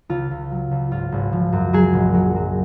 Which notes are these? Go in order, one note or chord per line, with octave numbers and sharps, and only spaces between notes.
C#2 F4
C#2
F#3
C#2
G#1 F4
G#1
F3
F#2
F#3 G#4
A#1
F#3
F#3